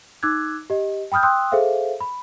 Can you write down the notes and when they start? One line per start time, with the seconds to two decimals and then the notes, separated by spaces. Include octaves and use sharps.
0.23 D#4 D6 E6 F#6 G#6
0.70 G4 D#5
1.12 G5 B5 D#6 F6 G6
1.23 G5 C6 D#6 E6 F#6
1.52 G#4 A4 C5 E5 F5
2.01 B5